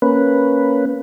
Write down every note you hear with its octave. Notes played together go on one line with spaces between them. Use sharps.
A#3 C#4 B4